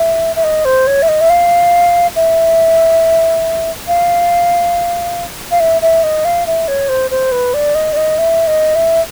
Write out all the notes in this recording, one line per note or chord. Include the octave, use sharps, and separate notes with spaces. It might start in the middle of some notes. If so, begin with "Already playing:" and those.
Already playing: E5
E5
D#5
C5
C#5
E5
D#5
E5
F5
E5
F5
F5
E5
E5
D#5
F5
E5
C#5
C5
C5
B4
D5
D#5
D5
D#5
E5
D#5
E5